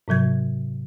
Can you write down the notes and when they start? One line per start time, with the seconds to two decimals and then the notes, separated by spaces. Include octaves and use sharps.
0.08 G#2 C3 F#3 G#6